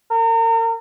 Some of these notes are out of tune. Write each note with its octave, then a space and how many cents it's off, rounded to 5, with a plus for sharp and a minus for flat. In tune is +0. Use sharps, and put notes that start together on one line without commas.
A#4 -35